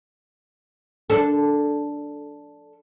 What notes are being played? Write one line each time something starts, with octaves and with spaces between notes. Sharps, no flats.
D4 A4